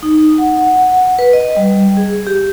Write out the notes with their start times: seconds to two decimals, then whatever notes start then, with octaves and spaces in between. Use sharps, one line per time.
0.03 D#4
0.38 F#5
0.66 F#5
1.19 B4
1.33 D#5
1.56 G3
1.97 G#4
2.27 G4